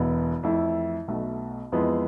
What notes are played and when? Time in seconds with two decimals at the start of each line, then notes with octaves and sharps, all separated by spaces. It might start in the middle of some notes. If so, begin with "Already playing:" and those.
Already playing: E1 E2 B2 B3 E4
0.43 F2 E3 A3 E4
1.08 B1 B2 A3
1.72 F2 E3 G#3 B3 F4